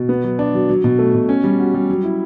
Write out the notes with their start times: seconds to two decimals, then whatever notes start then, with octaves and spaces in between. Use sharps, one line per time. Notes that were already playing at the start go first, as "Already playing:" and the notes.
Already playing: B2
0.09 B3
0.24 F#3
0.39 D4
0.54 F#3
0.69 F#3
0.84 B2
0.99 A3
1.14 B2
1.29 C#4
1.44 G3
1.60 F#4
1.74 G3
1.90 F#3
2.04 E4